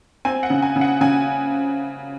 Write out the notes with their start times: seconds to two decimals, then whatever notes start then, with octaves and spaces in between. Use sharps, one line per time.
0.25 C4 G#5
0.43 F#5
0.50 C#3
0.62 G#5
0.76 C#3
0.81 F#5
1.01 C#3 G#5